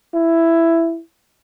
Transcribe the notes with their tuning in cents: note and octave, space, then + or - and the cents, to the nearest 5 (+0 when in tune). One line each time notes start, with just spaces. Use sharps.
E4 +10